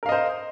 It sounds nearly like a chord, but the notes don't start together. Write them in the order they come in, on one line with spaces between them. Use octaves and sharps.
A#4 F5 D#5 C5